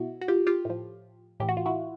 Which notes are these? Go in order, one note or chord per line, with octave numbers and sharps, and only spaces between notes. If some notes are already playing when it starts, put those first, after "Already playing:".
Already playing: B2 E4 F#4
F#4
F4 G4
F4 G4
A2 F3
A2 E3 G4
F#4
F4
E4 F#4